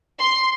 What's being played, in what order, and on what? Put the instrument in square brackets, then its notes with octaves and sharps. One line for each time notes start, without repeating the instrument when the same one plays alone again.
[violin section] C6